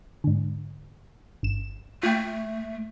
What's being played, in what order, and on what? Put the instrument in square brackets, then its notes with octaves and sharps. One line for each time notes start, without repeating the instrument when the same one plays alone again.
[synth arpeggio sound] G#2 D3
G1 E7
[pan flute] A3 [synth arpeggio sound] F4 G5